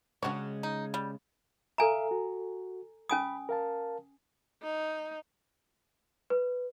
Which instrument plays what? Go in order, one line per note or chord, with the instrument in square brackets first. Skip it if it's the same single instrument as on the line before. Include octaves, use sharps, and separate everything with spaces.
[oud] C#3 G#3 [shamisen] D4 F#4 C#5
[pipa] D#4
G3
[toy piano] A4 G#5 A#5 [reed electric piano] E5 F5
[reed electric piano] F#4
[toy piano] C#4 G#5 D#6 [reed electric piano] B5
[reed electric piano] A#4 F5 A5
[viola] D#4
[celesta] B4